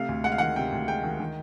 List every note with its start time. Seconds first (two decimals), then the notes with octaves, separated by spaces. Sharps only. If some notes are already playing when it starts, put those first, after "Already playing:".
Already playing: C3 A3 F5
0.09 D2
0.24 G#3 F#5
0.32 F5
0.38 D#3 F#5
0.56 C3 G5
0.72 D2
0.88 G#3 G5
1.04 D#3
1.20 D#3